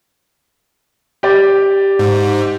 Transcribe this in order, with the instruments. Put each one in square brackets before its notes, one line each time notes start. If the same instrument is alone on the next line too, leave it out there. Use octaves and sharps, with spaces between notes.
[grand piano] G4 D5
[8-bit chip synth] G#2